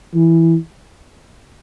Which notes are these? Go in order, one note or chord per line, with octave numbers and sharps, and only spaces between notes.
E3